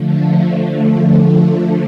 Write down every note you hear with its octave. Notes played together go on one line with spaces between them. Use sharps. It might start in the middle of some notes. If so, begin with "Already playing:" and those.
Already playing: D3 F3 A3